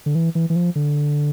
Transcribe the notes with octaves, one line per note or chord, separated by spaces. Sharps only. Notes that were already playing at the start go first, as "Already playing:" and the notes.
D3
E3
E3
E3
F3
D3